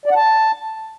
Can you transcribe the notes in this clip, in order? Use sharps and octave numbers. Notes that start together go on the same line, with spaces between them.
D5
F#5
A5